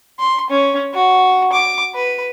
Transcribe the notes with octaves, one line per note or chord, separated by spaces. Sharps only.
C6
C#4
F#4
D6
B4